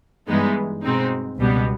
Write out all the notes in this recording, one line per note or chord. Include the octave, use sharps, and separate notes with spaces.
G2 E3 G#3 B3 D#4
B2 G#3 C4 D#4
C#2 B2 G3 B3